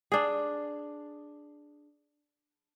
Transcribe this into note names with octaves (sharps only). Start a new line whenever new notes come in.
D4 G#4